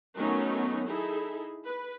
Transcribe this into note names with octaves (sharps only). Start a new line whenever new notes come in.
D#3 F#3 A3 B3 C#4 D#4
D#4 E4 G#4 A4
B4